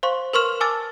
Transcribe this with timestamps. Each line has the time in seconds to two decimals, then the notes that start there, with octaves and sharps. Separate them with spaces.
0.03 C5 F5 C6 C#6
0.33 A#4 B4 C6 C#6 F6 E7
0.61 G#5 A5 D6 E6 F6 A6